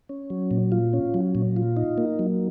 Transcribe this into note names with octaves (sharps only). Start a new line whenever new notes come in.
C#4
F#3
A#2
F4
C#4
F#3
A#2
F4
D#4
A#3
F#3